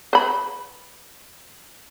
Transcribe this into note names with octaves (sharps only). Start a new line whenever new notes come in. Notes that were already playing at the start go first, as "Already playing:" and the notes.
B4 B5